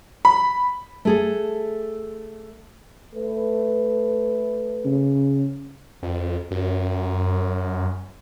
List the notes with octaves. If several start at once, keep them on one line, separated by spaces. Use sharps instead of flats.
B5
A3 G#4 A4
A3 B4
C#3
F2
F#2